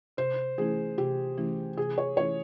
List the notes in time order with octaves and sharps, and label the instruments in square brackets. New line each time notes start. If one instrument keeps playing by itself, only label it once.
[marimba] C3 [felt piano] C5
[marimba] E3 A3 C#4 E4 [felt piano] G#4
[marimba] C3 [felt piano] G4
[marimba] E3 A3 C#4 E4
[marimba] C3 [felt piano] G#4
[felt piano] C#5
[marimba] E3 A3 C#4 E4 [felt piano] C#5